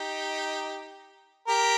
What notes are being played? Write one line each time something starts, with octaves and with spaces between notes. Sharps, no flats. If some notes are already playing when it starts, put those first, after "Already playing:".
Already playing: D#4 G4
G4 A#4